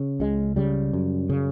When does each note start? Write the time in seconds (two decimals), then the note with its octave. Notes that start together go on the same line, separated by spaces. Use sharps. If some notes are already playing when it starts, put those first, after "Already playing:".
Already playing: C#3
0.20 C#2 G#3
0.56 C#3 G3
0.93 F#2
1.30 C#3